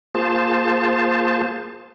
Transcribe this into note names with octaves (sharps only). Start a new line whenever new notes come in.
A#3 F4 G#4 C5 A5